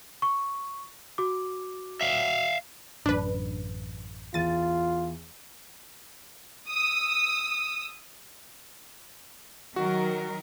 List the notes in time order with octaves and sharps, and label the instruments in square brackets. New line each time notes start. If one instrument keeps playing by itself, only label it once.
[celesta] C#6
F#4 D6
[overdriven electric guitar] E5 F5
[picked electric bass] A1 F#2 [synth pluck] D4 B4
[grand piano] E2 D#7 [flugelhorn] F4 [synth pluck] A6
[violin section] D#6 E6
[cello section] D#3 F#3 A#4 [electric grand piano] F#4